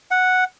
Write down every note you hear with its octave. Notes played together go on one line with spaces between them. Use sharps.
F#5